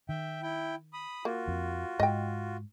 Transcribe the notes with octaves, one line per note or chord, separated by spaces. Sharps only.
D#3 E5 G5
E4 G5
B5 D#6
A#3 F4 F#4
F2
G#2 D#5 G5